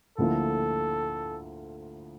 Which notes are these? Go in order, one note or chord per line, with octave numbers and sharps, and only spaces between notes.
D2 D3 F3 A#3 E4 A4